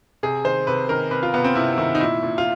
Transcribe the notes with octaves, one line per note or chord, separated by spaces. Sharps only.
C3 G#4
D#3 C5
C3 B4
D#3 A#4
C3 B4
F4
C3 B3
C4
C3 E4
D#3 E4
D#4
A#2 E4
A#2
F4